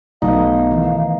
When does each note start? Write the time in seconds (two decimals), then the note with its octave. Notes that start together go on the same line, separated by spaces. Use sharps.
0.22 B1 A3 B3 D#4 F5
0.71 D#3 E3